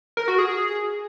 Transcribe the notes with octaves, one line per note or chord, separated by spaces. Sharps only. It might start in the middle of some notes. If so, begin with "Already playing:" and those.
A#4
F#4
G#4